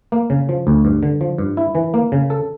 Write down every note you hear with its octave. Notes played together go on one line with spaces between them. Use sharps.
A#3
C#3
F3
D2
G2
D3
F3
G2
E4
E3
A#3
C#3
A4